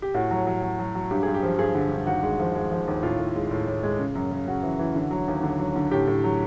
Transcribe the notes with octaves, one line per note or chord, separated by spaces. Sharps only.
G4
A2 F#4
F#3
F#3
F#3
F#3
F#3
G2 G4
G2 G#4
G4
F3
G2 G#4
D3
G2
D#2 F#4
G#3
F3
G#3
F3
D#2
A2 F4
A2
G#3
A2
A2
G#3
C#3
F#2
C#3
C#3 F#4
E3
E3
D3
F#3
D#2
D3
F#3
D3
A2 G4
A2
F#3